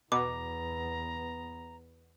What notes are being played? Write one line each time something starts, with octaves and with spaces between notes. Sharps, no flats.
E2 B2 B3 A#5 D6